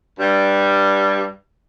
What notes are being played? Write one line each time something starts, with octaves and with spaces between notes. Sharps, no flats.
G2 G3